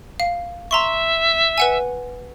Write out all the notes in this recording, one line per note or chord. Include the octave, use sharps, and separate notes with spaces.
F5
E5 A#5 C6 C#6
B4 F#5 G#5